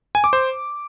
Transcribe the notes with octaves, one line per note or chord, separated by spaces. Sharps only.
G#5
D6
C5